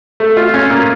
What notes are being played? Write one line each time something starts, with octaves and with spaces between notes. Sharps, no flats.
A3
F4
C#4
A#2